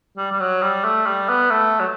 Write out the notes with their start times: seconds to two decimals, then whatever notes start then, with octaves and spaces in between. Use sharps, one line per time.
0.17 G3
0.32 G3
0.39 F#3
0.62 G3
0.84 A3
1.06 G3
1.29 B3
1.51 A3
1.80 F#3